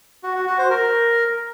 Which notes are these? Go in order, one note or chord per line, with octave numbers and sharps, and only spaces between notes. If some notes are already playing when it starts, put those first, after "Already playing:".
F#4
F#4
F#4
C5
A#4